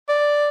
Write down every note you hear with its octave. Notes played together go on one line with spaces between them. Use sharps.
D5